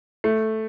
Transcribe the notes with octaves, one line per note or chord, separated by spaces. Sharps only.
A3